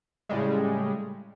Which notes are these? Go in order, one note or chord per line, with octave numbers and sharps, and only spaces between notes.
A2 C#3 G3 G#3